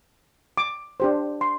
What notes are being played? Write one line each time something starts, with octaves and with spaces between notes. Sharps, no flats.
D6
D4 G4 C5
C6